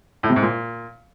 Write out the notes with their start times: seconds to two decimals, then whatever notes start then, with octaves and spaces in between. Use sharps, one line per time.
0.23 A2
0.30 C3
0.36 G#2
0.42 A#2